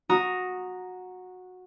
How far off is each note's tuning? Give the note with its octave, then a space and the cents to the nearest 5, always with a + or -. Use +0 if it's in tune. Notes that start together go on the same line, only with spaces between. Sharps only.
F#4 -15 A#5 +0 D#6 +0